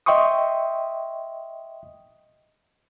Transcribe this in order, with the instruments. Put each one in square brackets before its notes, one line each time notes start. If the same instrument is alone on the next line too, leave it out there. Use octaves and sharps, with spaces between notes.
[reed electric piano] D#5 E5 G5 C6 C#6 D#6